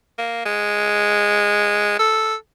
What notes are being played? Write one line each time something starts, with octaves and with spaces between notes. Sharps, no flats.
A#3
G#3
A4